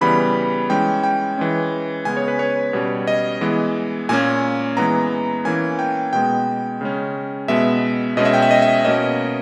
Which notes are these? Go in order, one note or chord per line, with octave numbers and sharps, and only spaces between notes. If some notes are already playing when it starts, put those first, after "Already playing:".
C#3 E3 G3 B3 B5
E3 G#3 C#4 G5
G5
E3 G#3 C#4
C#3 G#3 B3 G#5
C#5
B4
C#5
B2 G3 C#4
D#5
E3 G#3 B3
A#2 A#3 C#4 G#5
E3 G#3 B3 A#5
E3 A#3 C#4 G#5
G5
B2 G#3 B3 G5
C#3 G#3 C#4
B2 G#3 B3 E5
B2 G#3 C#4 D#5
E5
G5
E5
D#5
E5
B2 A#3 C#4 D#5